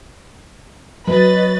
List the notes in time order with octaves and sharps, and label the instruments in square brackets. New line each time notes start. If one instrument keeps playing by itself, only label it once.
[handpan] F#3 [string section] B4 D#5 A6